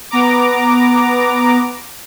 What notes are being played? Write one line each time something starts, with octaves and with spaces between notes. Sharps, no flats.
B3 A#5 D6